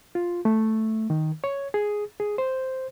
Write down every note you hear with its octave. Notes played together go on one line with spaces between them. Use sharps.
F4
A3
D#3
C#5
G#4
G#4
C5